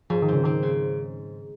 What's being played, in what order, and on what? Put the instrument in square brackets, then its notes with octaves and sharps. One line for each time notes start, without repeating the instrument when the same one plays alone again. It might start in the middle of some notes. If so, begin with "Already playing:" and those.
[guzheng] G#2 [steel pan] F3
[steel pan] D#3
[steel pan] C#3 [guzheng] C4
[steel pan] D#3 [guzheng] C4
[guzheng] C#3